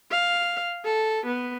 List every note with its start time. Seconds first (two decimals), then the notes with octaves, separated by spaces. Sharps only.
0.12 F5
0.85 A4
1.27 B3